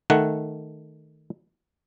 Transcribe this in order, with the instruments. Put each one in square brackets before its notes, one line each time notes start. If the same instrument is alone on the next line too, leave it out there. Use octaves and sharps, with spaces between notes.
[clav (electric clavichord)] D#3 A3 F#5